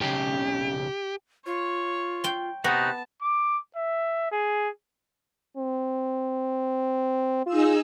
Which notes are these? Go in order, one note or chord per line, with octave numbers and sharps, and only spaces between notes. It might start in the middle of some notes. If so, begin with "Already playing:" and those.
B1 C#3 G4
F4 C#5
G5 C6
C3 B3 D#4 F#4 A5
D6
E5
G#4
C4
D#4 F4 G#4 E6